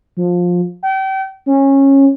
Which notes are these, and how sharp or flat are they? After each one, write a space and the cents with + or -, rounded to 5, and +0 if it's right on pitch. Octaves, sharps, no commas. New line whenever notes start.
F3 +20
G5 -35
C#4 -20